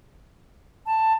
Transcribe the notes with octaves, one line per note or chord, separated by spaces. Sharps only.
A5